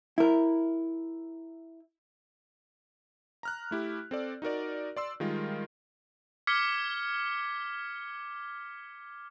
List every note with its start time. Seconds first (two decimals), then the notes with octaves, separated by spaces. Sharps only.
0.18 E4 A#4
3.43 A#5 F6 F#6
3.71 A3 E4 G4
4.11 C4 A4 D5
4.42 D#4 F#4 A#4 D5
4.96 D5 C6 E6
5.20 D#3 G3 G#3 F4 A#4
6.47 D6 F6 G#6 B6 C#7 G7